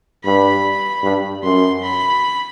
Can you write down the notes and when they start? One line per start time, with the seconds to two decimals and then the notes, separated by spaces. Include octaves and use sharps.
0.24 G2 B5
1.03 G2
1.43 F#2 C6
1.82 B5